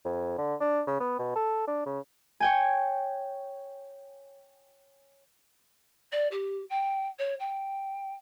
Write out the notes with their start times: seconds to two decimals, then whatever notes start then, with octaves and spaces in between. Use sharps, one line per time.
0.05 F2
0.38 D3
0.60 D4
0.87 C#3
1.00 B3
1.19 B2
1.35 A4
1.67 D4
1.86 C#3
2.40 C#5 G5 G#5
6.12 D5
6.31 G4
6.70 G5
7.19 C#5
7.39 G5